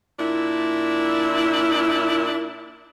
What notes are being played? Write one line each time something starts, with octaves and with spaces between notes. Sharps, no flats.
A#2 D4 E4